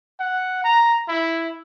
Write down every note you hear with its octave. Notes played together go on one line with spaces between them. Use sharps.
F#5
A#5
E4